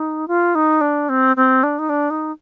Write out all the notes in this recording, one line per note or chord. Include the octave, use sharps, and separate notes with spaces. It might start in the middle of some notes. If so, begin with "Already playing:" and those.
Already playing: D#4
F4
D#4
D4
C4
C4
D4
D#4
D4
D#4